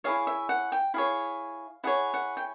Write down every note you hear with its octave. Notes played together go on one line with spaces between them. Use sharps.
E4 G#4 C#5 F5
E5
F#5
G5
E4 G#4 C#5 F5
E4 G#4 C#5 F#5
F#5
G5